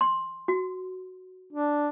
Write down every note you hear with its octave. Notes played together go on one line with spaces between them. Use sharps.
C6
F#4
D4